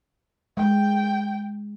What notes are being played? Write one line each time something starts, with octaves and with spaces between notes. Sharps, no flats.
G#3 G5